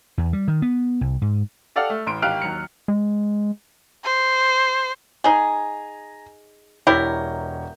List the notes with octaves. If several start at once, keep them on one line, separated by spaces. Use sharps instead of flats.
E2
G3
D#3
B3
C2
G#2
G4 A4 D5 F5 F#5 F6
A3
A1 C6 D7
G#1 G4 F5 F6 F#6 D7
D#2 F#3 C#7
G#3
C5
D#4 G#4 G#5 A#5
E1 E4 G4 A#4 C#5 G6